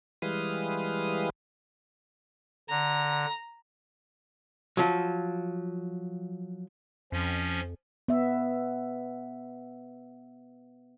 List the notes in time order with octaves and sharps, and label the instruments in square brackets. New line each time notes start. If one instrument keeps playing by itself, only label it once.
[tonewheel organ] E3 G3 G#3 B4 F5 D#6
[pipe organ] D3 [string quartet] A#5
[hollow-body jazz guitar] F3 F#3
[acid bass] F2 [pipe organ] F3 C#4
[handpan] B3 E5